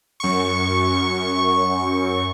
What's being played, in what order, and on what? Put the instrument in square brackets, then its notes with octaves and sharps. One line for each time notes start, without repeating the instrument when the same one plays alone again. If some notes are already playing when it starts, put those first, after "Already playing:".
[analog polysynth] F#2 C#6